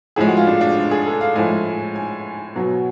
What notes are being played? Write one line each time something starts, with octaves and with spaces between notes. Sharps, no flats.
A2 F3 G#3 G#4
F#4
F4
D4
D4
G#4
A4
F5
A2 F3 G#3 G#5
G#5
B2 F#3